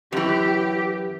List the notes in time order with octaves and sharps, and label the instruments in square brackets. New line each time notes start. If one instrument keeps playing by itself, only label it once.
[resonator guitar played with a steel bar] F#2 E3 [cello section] G4